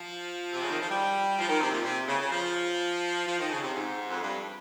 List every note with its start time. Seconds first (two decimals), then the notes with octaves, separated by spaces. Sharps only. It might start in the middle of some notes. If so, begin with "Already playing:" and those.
Already playing: F3
0.53 C3
0.62 C#3
0.70 D#3
0.80 F3
0.89 G3
1.39 F3
1.48 D#3
1.60 C3
1.72 A#2
1.84 C3
2.07 C#3
2.20 C#3
2.31 F3
3.26 F3
3.39 D#3
3.50 C#3
3.62 C3
3.74 G#2
4.09 F2
4.21 G2